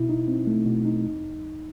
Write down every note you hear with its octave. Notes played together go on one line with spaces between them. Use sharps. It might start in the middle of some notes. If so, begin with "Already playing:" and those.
Already playing: B2 E4
D#4
C4
A3
B2
D#4
E2